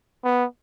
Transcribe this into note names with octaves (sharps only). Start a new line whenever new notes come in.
B3